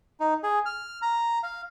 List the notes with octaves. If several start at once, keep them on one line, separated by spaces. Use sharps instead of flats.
D#4
G#4
F6
A#5
F5